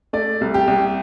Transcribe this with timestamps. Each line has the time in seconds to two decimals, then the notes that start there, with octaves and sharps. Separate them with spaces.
0.13 A3 D5
0.41 C2
0.54 G4
0.67 C2